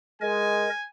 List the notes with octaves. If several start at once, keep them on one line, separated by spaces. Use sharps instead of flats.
G#3 A#4 D#5 G#5